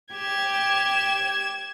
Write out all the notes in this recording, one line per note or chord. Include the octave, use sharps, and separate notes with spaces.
G4 G#6 E7